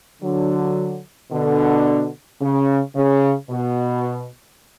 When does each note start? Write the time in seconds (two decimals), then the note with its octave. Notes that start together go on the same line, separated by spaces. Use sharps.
0.22 D3 F#3
1.31 B2 D3
2.41 C#3
2.96 C#3
3.50 B2